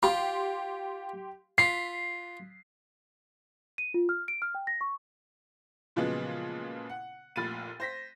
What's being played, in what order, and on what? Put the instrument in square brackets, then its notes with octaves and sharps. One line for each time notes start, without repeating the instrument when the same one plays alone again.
[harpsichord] F4 [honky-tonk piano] G4 C6
[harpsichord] F4 [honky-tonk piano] B6 [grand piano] C7
[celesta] D#7
F4
F6
D7
F6
G5
A#6
C#6
[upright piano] A#2 C#3 F3 F#3 G#3 B3
F#5
F1 A#2 B5 A6 D#7
C5 A#6 B6